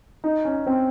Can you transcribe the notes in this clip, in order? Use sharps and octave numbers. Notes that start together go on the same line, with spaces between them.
D#4
C#4
C4